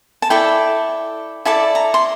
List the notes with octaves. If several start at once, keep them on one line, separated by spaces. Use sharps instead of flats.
A5
E4 A4 D5 G5
E4 A4 D5 A5
A#5
C6